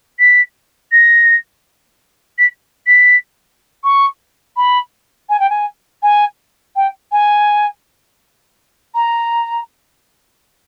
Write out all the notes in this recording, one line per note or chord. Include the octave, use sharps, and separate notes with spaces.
B6
A#6
B6
B6
C#6
B5
G#5
G5
G#5
G#5
G5
G#5
A#5